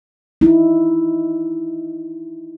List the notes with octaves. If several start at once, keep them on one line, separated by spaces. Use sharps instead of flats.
D#4 E4